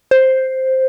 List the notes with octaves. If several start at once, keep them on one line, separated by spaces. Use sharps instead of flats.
C5